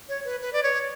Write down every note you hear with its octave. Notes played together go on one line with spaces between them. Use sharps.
C#5
B4
B4
D5
C#5